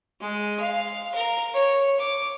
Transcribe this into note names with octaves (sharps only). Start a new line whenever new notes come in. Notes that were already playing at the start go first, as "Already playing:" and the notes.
G#3
F5
A#4
C#5
D6